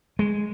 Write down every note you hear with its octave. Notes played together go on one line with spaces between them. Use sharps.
G#3